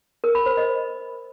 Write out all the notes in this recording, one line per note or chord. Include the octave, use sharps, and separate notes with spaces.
A#4
B5
C5
D#5